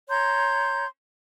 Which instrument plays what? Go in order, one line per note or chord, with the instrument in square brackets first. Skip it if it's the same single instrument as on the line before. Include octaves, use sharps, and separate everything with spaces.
[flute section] C#5 A#5 C6 G6